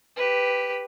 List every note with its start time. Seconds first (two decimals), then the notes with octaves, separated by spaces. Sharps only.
0.16 G4 B4